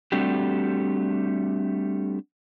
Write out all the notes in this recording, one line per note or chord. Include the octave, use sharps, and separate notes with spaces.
G3 A3 C4 D4 F#4 G4